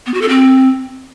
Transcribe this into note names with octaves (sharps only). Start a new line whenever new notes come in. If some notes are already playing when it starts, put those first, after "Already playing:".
B3
F#4
A4
C4